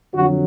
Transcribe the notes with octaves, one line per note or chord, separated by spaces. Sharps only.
F2 D3 F#3 F#4